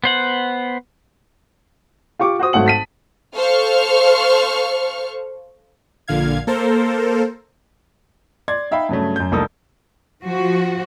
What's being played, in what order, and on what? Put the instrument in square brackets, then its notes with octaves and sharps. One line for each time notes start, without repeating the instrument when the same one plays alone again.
[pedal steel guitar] B3 C5 F#5
[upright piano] F4 G4 C#6 D6
F#4 C5 D#6
G#1 F#3 A3 F#5 F#7
A5 B6 D#7
[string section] A4 C5 F5 C#6 F6
[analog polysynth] A#1 A#2 D3 F5 G#6
A#3 A4 A#4 C5
[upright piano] D5 C6 G#6
D#4 E5 F5 G5 B5
G2 C#3 F#3 A3
F#2 G6
F1 C2 A#3 A4 D#6
[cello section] F3 F#4